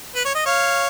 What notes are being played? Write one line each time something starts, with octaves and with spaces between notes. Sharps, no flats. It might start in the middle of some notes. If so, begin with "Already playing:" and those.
B4
C#5
D#5
C#5 F5